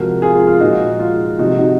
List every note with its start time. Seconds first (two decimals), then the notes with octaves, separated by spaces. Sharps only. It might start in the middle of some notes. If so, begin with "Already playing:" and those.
Already playing: C3 F3 G#3 F#4 A#4
0.22 F4 G#4
0.36 F4
0.47 F4
0.60 A#2 F3 G#3 D#4 F#4
0.99 F4
1.39 C3 F3 G#3 D#4 F#4
1.58 D#4 F#4